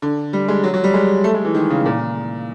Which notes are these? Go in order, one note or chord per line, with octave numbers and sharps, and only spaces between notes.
D3
G3
G#3
F#3
F#3
G3
G#3
A3
G#3
E3
D#3
C#3
A#2